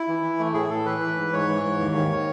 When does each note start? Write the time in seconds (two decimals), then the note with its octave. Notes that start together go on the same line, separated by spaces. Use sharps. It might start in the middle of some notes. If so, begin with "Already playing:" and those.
Already playing: E4
0.08 E3
0.23 E3
0.39 A3
0.54 A2 G#4
0.70 A2 A4
0.85 E3 B4
1.01 E3
1.17 G#2
1.33 G#2 C#5
1.49 E3
1.64 G#2
1.80 D#2
1.95 D#3
2.12 D#3